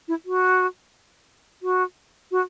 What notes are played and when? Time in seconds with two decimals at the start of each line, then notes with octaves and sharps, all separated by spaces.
0.08 E4
0.25 F#4
1.62 F#4
2.31 F#4